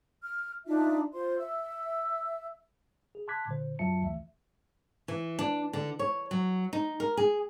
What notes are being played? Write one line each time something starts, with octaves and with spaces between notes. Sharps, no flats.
F6
D4 D#4 F4 E5
F4 C5 C6
E5 E6
G#4
A5 C6 D6 F#6 G#6 B6
A#2 D3 C5
F#2 F#3 F4 E5 A5 C#7
D2 E3 A3 E5
E3
D4
D3
C#5
F#3
D#4
A#4
G#4